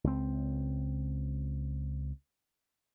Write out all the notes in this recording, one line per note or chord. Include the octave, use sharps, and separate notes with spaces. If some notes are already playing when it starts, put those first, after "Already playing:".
C#2 C4